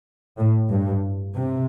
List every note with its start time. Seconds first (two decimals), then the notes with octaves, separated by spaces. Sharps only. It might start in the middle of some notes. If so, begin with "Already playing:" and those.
0.39 A2
0.70 G2
1.35 C3